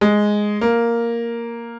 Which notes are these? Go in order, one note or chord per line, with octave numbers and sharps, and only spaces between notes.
G#3
A#3